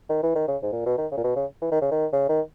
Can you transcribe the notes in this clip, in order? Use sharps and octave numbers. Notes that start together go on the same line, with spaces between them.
D#3
E3
D#3
C#3
G#2
A#2
B2
D#3
C#3
A#2
B2
C#3
E3
D#3
C#3
D#3
C#3
D#3